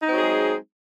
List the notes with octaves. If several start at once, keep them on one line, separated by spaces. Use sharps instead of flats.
F#3 G#3 C4 D#4 G#4